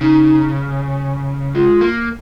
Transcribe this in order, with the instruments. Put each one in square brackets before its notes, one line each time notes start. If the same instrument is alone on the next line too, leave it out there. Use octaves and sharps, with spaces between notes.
[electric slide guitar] C#3 [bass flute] D#4
[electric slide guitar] G#3 [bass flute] F4
[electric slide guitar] A#3